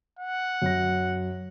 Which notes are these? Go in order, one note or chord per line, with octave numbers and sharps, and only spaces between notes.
F#5
F#2 A#6